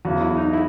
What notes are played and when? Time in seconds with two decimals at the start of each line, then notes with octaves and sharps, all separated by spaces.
0.05 E2 C#3 F#3 F#4
0.21 E4
0.37 D#4
0.53 E4